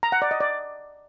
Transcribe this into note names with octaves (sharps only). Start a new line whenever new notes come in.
A#5
F#5
D5
D#5
D5